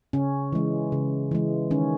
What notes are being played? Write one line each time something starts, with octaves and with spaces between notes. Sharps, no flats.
C#3 C#4
E3 G#3
C#3
E3 G#3
D#3 C#4